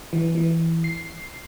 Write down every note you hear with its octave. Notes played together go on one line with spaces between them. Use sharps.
E3
E3
C7